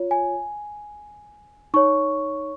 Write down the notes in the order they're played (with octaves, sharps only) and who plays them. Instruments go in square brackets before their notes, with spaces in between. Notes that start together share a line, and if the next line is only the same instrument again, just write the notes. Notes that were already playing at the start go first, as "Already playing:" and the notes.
Already playing: [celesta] F4 C#5
G#5
D#4 C#5 C#6